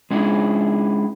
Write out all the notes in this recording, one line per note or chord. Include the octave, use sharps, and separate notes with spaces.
G#3 C#4 D4 E4 G#4